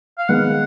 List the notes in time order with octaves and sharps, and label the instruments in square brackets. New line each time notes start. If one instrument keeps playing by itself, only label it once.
[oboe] F5
[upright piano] D#3 G#3 B3 [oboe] F#5